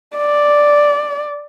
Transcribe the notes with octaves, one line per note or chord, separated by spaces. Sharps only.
D5